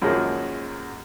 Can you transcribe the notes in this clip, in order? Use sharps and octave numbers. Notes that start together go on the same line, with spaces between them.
F#2 D#3 F3 F#3 G#3 A#3